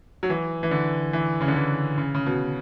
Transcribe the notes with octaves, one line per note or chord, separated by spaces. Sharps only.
F#3
E3
E3
D3
E3
C#3
D3
E3
C#3
C#3
B2